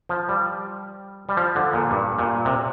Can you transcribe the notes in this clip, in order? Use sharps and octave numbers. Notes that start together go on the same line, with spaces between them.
F3
G3
G3
F3
D3
A#2
G2
A#2
C3